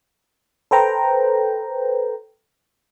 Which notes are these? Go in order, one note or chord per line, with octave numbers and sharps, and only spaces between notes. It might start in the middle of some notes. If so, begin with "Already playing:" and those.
A4 B4 C5 G5 A#5